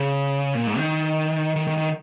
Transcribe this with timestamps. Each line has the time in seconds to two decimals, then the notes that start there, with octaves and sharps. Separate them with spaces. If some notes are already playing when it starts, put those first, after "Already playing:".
Already playing: C#3
0.55 A#2
0.67 G#2
0.78 D#3
1.56 D#3
1.67 D#3
1.78 D#3